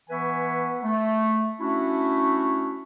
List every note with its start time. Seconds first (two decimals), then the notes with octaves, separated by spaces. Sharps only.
0.10 E3 B3 B4 E5 G#5 C#6
0.83 A3
1.60 A3 C#4 D4 E4 F#4